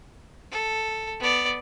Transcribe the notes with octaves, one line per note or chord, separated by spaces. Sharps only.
A4
B3 D5